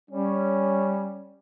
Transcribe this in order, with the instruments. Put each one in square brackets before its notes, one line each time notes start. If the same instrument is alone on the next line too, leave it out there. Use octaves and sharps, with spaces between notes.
[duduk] G3 [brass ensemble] C#4